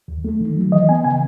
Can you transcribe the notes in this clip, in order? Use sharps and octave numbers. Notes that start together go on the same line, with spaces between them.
D#2
A3
D#3
F#3
E3 D#5
B3 G#5
C#3 G#5